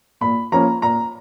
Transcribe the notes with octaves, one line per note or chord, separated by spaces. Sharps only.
A#2 B5
F3 A#3 C#4 A#5
A#2 A#5